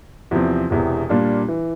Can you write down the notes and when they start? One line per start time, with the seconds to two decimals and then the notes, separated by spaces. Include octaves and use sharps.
0.31 E2 C3 F3 C4
0.70 E1 E2 C3
1.09 A#2 G3 A#3 D4 F4
1.48 E3